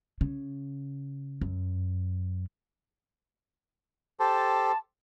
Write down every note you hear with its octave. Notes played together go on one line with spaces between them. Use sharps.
C#3
F#2
G4 A4 C5 A5